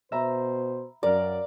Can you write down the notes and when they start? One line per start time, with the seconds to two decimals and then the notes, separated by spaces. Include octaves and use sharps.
0.12 B2 C5 E5 A#5 B5
1.03 F#2 A#4 D5 F5